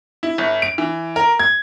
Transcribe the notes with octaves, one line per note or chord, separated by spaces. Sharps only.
E4
G1
D7
E3
A#4
G#6